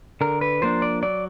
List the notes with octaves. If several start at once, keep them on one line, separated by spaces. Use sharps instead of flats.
D3 A#4
B4
F3 A#3 D4 C5
D5
F#3 D5